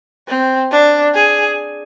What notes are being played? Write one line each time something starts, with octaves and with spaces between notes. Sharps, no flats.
C4
D4
G#4